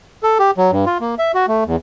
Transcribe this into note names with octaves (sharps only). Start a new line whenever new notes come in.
A4
G4
F#3
G2
F4
A#3
E5
F#4
A3
E2